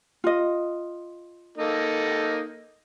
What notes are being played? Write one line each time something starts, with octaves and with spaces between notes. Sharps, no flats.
F4 D#5
A#3 D#4 A4